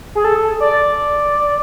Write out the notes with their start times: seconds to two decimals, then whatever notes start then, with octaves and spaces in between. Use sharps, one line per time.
0.15 G#4
0.24 A4
0.60 D5